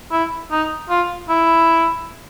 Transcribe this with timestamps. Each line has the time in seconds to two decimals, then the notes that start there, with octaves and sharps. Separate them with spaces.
0.12 E4
0.51 D#4
0.90 F4
1.29 E4